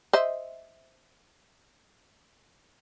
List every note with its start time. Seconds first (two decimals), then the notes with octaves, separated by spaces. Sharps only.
0.13 C5 D#5 E5